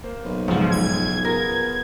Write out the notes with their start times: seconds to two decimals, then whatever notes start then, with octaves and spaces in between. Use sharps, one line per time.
0.04 A#3 C5
0.25 B1
0.48 C#2 G#2 C#3 F3
0.71 G#6
1.25 B3 F4 G#4 A#4